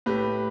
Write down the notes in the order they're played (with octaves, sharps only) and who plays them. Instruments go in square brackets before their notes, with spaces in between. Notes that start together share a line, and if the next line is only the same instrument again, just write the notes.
[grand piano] A2 G4 B4